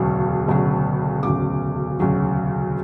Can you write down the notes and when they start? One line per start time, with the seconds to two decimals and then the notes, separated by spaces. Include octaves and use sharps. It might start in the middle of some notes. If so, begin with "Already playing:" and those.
Already playing: E1 D2 C#3 F#3
0.47 E1 D2 C#3 F#3
1.23 E1 D2 C#3 F#3 D6
2.00 E1 D2 C#3 F#3